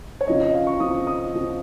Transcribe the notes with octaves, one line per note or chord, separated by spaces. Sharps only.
C#5
C#3 F3 C4 D#5
D#5
F5
C#6
C#3 F3 C4 D#6
D#6
C#3 F3 C4